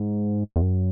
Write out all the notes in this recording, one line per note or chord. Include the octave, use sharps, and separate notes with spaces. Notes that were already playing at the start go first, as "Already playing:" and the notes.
Already playing: G#2
E2
F#2